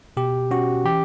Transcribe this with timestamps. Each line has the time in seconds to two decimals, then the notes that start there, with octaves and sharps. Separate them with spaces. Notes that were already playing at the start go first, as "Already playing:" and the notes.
0.17 B2 G4
0.51 C#4 F#4
0.85 E3 G4